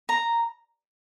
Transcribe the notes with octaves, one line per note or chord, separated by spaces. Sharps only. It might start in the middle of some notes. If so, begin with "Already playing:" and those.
A#5